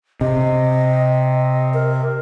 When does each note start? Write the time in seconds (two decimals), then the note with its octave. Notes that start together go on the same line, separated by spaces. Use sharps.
0.21 C3 D#5
1.74 A#4